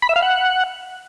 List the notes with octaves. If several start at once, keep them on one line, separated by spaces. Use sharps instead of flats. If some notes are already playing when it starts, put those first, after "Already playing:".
B5
E5
F5
F#5